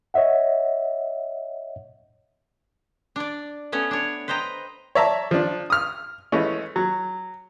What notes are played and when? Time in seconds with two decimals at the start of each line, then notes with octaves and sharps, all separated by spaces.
0.14 C#5 D#5 E5 F#5
3.16 D4 D5
3.72 A3 B3 C#4 C#5
3.91 D4 C#5
4.28 B4 C5 D#5 G5 A#5
4.95 C#5 D5 E5 A5 A#5
5.31 F3 D4
5.70 D#6 F6
6.32 E3 G#3 A3 C#4
6.76 F#3